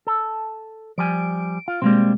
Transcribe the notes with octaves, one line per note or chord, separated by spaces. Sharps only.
A4
F3 G3 G#5 D7
F4
B2 G3 G#3 A#3 C4